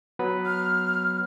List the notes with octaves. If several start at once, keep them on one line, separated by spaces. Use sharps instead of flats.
F#3 B3 B4
F6